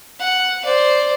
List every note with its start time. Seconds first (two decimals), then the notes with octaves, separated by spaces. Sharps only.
0.19 F#5
0.64 C5 D5